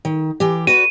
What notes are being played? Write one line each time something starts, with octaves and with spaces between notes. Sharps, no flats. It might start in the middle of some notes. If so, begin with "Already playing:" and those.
D#3
E3 G4
F#4 B4 D5 D#7